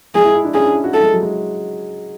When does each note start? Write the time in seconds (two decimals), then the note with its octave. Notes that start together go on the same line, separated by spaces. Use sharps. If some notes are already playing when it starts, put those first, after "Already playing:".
0.15 G#3 G#4
0.25 E4
0.35 E4
0.45 D4
0.54 C#4 G#4
0.64 D4
0.74 E4
0.84 F#4
0.93 E4 A4
1.03 G#3
1.13 F#3
1.23 G#3